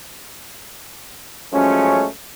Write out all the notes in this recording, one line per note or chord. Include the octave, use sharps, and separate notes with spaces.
F#2 F3 G#3 A3 C#4